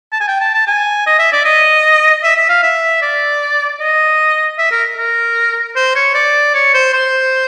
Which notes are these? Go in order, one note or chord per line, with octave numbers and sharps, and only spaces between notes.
A5
G#5
G5
A5
A5
G#5
D#5
E5
D5
D#5
E5
E5
F5
E5
D5
D#5
E5
A#4
A#4
C5
C#5
D5
C#5
C5
C5